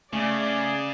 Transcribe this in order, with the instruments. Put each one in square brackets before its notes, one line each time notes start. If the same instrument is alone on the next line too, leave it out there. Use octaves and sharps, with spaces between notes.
[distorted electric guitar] C#3 [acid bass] A3 [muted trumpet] G#4 [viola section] D5